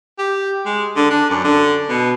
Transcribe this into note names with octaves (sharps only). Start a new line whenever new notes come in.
G4
G#3
D3
D4
F#2
D3
B2